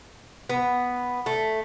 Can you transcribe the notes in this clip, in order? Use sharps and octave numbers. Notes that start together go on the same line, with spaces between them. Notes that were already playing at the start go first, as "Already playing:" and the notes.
B3
A3